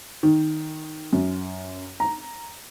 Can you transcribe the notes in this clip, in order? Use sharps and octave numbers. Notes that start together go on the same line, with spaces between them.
D#3
F#2
A#5